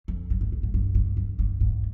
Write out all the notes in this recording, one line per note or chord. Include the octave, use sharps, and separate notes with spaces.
F2
G2
G#2
G2
G#2
G2
G2
F2
G2
G#2